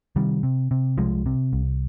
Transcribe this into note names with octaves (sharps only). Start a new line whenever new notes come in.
C3 D#3 G3
C3
C3
C2 F3 G#3
C3
C2